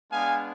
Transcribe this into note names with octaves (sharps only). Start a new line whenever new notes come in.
G#3 B3 D4 F5 G#5